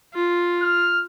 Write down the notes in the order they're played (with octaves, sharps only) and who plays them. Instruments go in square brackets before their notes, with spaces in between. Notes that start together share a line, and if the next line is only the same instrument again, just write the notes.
[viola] F4
[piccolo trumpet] F6